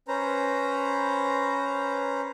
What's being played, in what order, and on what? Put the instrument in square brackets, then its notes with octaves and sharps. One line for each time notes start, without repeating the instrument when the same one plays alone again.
[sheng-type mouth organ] C#4 B4 C5 A#5